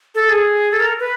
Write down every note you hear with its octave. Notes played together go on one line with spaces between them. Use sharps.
A4
G#4
A4
A#4
B4